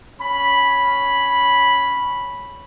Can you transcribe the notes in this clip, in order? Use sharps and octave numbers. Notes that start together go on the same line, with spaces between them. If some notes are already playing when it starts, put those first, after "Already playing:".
C#4 B5